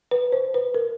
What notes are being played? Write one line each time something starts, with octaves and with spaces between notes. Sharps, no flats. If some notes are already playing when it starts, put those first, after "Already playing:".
B4
C5
B4
A#4